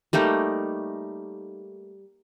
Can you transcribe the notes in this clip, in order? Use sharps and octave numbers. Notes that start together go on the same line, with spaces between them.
G3 A3 A#3 D#4